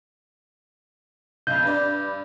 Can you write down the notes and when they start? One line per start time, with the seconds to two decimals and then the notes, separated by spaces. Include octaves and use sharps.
1.47 B1 F2 G6
1.63 G2 B4 D5